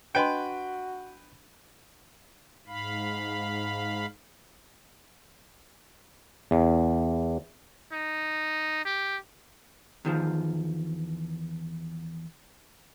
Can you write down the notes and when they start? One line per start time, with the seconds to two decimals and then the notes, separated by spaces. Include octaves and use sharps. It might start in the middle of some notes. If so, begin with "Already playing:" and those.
0.15 D4 F#4 B4 D#5 G5 C6
2.67 G#2 F5 B5
6.51 E2
7.92 D#4
8.85 G4
10.05 E2 D#3 F3